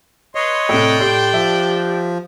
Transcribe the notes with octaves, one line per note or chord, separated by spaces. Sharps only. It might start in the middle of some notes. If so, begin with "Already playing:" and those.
B4 C#5 D#5 C6
A2 C3 D4 G5
A2 G4 C6
F3 E5